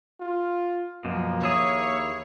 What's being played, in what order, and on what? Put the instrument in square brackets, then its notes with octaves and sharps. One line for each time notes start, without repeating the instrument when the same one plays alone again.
[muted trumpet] F4
[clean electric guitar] F#2 B2 [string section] F3 [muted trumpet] A#3
[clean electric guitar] D#2 E4 G#4 [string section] C#5